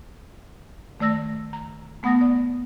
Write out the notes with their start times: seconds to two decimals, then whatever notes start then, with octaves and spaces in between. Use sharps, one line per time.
1.00 D#3 A3 D5 E6 A#6
1.53 A#5
2.03 A3 B3 F#5 D#6 A6 A#6
2.21 D5